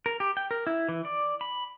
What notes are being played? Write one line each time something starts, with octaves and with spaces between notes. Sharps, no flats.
A#4
G4
G5
A#4
E4
E3
D5
B5